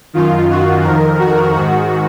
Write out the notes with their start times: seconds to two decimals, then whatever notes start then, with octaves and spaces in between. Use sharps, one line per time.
0.14 F#2 D#3 F4
0.50 F#4
0.84 F2 D#3 A#4
1.19 F#4
1.54 G#2 D#3 F#4